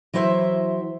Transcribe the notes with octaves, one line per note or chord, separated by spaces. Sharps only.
E3 F#3 E4 C5 E5